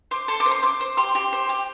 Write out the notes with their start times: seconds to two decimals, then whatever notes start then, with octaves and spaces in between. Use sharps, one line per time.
0.11 C5 D6
0.28 A4 C6
0.40 D6
0.46 C5
0.51 C6
0.63 C5 D6
0.81 C5
0.97 G4 C6
1.15 G4
1.33 C5
1.49 G4